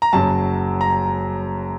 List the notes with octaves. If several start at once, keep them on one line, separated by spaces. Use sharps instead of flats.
A#5
F#1 F#2 F#3 A5
A#5